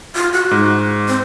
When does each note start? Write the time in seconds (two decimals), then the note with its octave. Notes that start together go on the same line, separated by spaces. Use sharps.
0.15 F4
0.33 F#4
0.51 G#2
1.08 C4